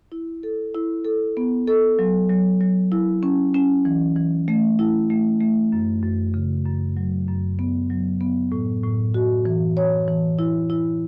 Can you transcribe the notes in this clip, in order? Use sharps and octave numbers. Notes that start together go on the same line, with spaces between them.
E4
A4
E4
A4
B3
A4
F#3
F#3
F#3
E4
C#4
C#4
E3
E3
A3
E4
A3
A3
F#2
F#2
C#3
F#2
F#3
F#2
B3
F#3
B3
A2
A2
F#4
E3
C#5
E3
E4
E4